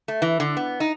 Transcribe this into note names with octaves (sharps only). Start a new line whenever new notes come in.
A3
E3
D3
B3
D#4